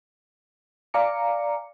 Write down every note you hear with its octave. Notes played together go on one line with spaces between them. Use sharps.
D5 F5 G#5 A#5 D6 C#7